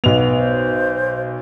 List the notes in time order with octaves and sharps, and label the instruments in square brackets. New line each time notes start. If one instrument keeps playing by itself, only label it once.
[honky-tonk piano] B1 F7 [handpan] B3
[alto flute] C5